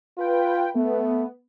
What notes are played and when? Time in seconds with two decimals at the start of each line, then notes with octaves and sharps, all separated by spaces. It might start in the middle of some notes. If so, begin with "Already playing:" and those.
0.19 F4 B4 G5
0.75 A3 B3